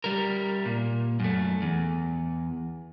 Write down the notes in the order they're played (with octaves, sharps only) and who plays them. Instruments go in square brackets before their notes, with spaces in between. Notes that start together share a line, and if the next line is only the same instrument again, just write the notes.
[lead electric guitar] G3 A#4
A#2
F#2 A3
E2